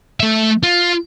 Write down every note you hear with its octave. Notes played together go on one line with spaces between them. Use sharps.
A3 E5
F4